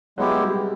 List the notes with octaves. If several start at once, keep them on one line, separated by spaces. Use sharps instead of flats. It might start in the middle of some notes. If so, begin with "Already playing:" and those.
F#3 G#3 B3 E4 G4
G3